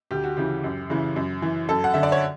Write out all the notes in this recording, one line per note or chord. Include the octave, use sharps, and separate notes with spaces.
D2 G4
F#4
C#3 E3 G4
F#2
C#3 E3
F#2
E3
F#2 A4
F#5
D3 E5
D5
C#5